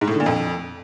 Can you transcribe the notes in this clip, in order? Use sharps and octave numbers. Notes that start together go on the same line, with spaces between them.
G#2
A2
D3
A#2
F2